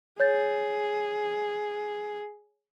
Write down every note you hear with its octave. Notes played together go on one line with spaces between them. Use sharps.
G#4 C#5 G6 A6